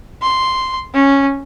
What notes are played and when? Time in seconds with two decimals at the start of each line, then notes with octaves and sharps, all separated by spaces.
0.22 C6
0.94 C#4